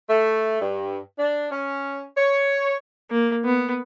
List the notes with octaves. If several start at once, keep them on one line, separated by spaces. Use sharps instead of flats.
A3
G2
D4
C#4
C#5
A#3
B3